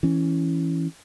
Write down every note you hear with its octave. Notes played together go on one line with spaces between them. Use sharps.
E3 C#4